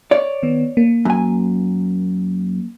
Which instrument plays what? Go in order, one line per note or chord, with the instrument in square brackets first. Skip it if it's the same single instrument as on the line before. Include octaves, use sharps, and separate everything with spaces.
[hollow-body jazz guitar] C#5 D5
[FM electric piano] D#3 B3
A#3
[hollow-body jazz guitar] F#2 G#5